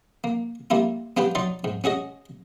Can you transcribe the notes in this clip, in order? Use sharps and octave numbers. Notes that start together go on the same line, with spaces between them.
A#3
G3 A#3 E4 F4
B3 D4 F4 G4 B4
F#3 D#4 D5 C6
G#2
C#4 F#4 G#4 D#5